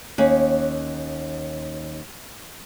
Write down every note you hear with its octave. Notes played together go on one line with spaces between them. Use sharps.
D#2 C#4